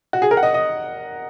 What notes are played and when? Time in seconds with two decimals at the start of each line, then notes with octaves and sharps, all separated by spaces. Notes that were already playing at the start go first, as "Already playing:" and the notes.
0.13 F#4
0.22 G#4
0.31 A#4
0.37 F#5
0.43 D#5
0.54 D#5